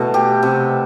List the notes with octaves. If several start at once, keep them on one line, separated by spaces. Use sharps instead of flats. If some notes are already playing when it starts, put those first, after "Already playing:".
Already playing: B2 E3 A3 E4
G4
C3